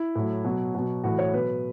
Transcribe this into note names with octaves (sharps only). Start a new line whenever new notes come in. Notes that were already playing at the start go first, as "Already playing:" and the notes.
Already playing: E4
A2 F#3
B2 F#3
B2 F#3
A2 E3 F#4
C#5
B2 F#3 B4